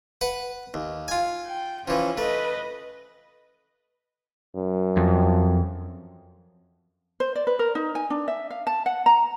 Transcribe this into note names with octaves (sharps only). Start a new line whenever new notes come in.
B4 F#5
D#2
F4 G#5
G5
E3 F3 C#4
A3 B4 D#5
F#2
F2
C5
D5
B4
A#4
D#4
G#5
D4
E5
F5
A5
F#5
A#5